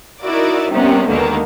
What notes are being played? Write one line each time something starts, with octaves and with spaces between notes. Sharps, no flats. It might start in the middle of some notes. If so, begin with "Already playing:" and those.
D#4 E4 F#4 A#4 D5
C3 D#3 G3 B3 C#4
D#2 B2 D3 D#3 G#3 A#3